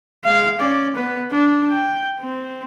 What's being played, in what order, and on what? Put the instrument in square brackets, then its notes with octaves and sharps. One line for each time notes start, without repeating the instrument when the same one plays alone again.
[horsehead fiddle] G#3 F5
C#4 D5
B3 B4
D4
G5
C4